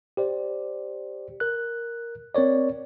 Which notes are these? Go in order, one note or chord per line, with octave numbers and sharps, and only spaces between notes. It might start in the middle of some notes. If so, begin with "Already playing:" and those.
G4 C5 D5
A#4 F#6
C4 A#4 C#5 D5